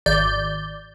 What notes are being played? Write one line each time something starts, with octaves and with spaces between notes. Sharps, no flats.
G#1 D5 G6